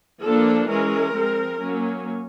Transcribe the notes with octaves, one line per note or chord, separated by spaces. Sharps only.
F3 A#3 D4 A4
E3 G#3 C#4 A#4
F3 G#3 C4
F#3 A#3 C#4